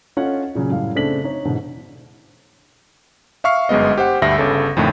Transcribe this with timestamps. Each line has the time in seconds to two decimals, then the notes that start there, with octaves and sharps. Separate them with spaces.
0.17 C#4 F4 A4 D#5 F#5
0.55 A#2 C#3 F#3 G#5
0.70 F#2 A2 G3 F5
0.95 C#3 A3 C4 D4 B6 F#7
1.24 D#4 C#5
1.45 G#2 B2 D3 E3
3.44 E5 F5 C#6 F6 C7
3.69 G1 F#2 G#3 B3 D#5
3.98 G4 C5 F#5
4.22 D2 G2 G4 E5 A#6
4.38 G1 C#3 A4
4.77 F2 A2 D3 D#3 A3